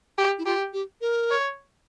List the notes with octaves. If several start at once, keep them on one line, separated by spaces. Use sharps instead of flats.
G4
E4
F4 G4
G4
A#4
C#5